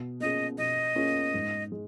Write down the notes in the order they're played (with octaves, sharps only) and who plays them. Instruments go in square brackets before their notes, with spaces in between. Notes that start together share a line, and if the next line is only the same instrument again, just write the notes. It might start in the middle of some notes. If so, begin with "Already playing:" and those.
Already playing: [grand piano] B2
[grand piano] A#3 C#4 F4 G#4 [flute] D#5
[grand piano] B2 [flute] D#5
[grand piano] A#3 C#4 F4 G#4
G#2
G#3